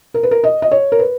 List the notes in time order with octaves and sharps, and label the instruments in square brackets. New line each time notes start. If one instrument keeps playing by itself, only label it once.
[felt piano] A#4
B4
A#4
D#5
D#5
C#5
A#4
B4